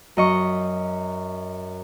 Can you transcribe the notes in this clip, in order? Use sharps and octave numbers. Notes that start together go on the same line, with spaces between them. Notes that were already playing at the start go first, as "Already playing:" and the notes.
F#2 D#5 C#6